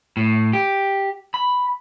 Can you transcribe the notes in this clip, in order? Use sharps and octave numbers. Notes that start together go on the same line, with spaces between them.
A2
G4
B5